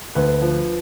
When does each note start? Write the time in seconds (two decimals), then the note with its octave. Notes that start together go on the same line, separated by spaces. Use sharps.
0.15 D2 B4
0.41 F3